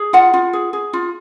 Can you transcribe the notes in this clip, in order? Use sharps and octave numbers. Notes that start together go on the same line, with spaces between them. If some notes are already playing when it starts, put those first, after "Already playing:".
Already playing: G#4
F4 F#5
F4
G#4
G#4
F4